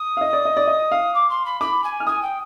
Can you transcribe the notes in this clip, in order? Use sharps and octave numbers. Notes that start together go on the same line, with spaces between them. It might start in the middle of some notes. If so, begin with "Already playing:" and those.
Already playing: D#6
F5
D#5
D5
D#5
D5
D#5
F5
D6
C6
B5
B5 D6
G#5
F6
G#5 D#6
G5